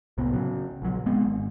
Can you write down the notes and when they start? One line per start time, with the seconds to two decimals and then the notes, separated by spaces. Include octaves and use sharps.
0.18 C2 A2 C3 B3
0.34 C#3 F#3
0.82 A#1 F#3
1.06 G#3 B3 C4
1.27 G#1